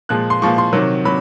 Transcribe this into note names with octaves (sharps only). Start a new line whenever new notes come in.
A#2 F3 G#3 F#6
C6
A#2 F3 G#3 C#6
C6
C3 D#3 F#3
F#3 B5